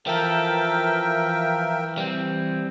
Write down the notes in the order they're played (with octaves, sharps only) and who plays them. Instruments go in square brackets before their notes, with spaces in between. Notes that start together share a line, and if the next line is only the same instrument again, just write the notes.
[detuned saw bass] E3 [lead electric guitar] F3 A4 [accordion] A#4 E5 G5
[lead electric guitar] G3 C4